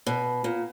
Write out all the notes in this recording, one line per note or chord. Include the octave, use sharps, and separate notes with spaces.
B2
A#2